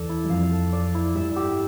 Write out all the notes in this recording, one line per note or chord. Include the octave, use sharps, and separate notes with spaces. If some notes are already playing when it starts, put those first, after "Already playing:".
Already playing: E2 E3 A4 D5
E4
G3
F2 F3 F5
A4
D5
E4
G2 G3 E5
G4